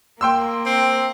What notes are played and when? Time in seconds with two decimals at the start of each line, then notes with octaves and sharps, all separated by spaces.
0.21 A#3 G5 C6 E6
0.66 C4